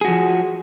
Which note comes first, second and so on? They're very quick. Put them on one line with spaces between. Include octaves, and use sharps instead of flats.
G#4 F#4 F3